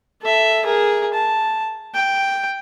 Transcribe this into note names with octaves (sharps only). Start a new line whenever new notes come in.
A4 E5
G#4 A#4
A5
G5